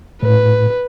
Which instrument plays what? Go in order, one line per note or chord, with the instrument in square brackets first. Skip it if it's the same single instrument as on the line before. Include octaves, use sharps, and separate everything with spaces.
[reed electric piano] A2 [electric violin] B4